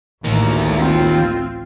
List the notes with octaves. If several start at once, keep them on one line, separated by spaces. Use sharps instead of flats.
A1 D2 D#3 A#3
C4 F4